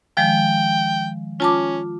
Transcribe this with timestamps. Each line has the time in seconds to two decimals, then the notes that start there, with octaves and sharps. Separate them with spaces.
0.17 D#3 F3 G#3 G5
1.40 C#4 F4 A5 D6